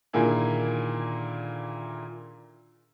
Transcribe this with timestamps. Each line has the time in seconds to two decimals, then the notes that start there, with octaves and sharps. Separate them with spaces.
0.13 A#2 D3 D#3 A#3 E4 G#4